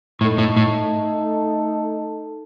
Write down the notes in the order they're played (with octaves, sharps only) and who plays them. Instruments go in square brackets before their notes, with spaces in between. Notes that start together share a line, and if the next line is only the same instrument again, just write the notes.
[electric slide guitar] A2 [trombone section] A3 D#4 A4
[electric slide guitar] A2
A2